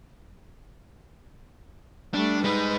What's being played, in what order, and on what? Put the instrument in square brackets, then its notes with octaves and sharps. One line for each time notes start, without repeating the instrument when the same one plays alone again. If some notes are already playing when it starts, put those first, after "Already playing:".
[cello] G3 A3 [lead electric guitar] D4
[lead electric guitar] G#3 D#4 [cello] B4